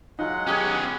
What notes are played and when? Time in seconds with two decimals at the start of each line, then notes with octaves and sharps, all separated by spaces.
0.19 F#3 G#3 D#4 F4 F#5
0.47 B3 C#4 G4 G#4 C#5